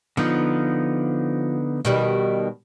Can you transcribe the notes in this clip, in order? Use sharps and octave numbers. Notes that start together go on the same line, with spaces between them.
D3 F3 B3 D#4
B2 D#3 G3